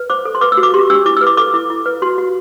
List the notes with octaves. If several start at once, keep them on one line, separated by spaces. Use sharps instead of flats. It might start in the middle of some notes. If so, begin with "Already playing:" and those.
Already playing: B4
C5 D6
A4
C6
B4 D6
E6
F#4
D6
G4 C6
D4 E6
E4 D6
E6
B4
D6
A4 D6
E4
E4
B4
F#4 C6
F#4